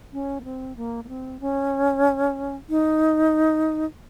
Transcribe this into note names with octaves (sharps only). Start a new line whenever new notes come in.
C#4
A#3
C4
A#3
A#3
C4
C#4
D#4